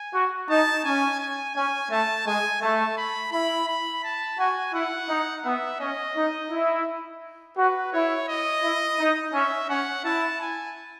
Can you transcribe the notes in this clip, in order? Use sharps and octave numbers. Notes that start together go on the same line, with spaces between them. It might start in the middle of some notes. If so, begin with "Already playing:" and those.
Already playing: G#5
F#4
D#4 A5
C#4 G#5
G#5
C#4 G#5
A3 A5
G#3 G#5
A3 A5
B5
E4 B5
B5
A5
F#4 G#5
E4 F#5
D#4
B3 E5
C#4 D#5
D#4
E4
F#4 B4
E4 C#5
D#5
E4
D#4
C#4 E5
C#4 F#5
E4 A5
G#5